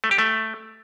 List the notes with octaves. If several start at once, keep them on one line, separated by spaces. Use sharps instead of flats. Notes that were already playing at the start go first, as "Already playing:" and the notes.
A3
G4
A3